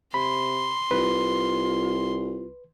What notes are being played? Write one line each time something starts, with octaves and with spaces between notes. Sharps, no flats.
C3 B5 C6
C2 F4 B4